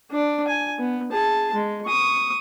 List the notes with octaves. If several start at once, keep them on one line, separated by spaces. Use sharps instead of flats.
D4 D5
G#5
B3
G#4 A5
G#3
C#6 D#6